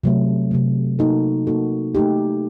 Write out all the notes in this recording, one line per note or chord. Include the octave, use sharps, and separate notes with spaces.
C3 F#3 A3
C3 F#3 A3
A#3 D#4 F#4 A4
A#3 D#4 F#4 A4
A3 D#4 G4